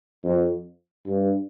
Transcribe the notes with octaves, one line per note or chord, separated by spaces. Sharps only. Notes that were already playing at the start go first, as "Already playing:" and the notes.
F2
G2